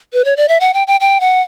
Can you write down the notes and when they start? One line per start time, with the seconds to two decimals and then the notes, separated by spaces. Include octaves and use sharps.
0.13 B4
0.25 C#5
0.37 D5
0.48 E5
0.60 F#5
0.74 G5
0.87 G5
1.00 G5
1.20 F#5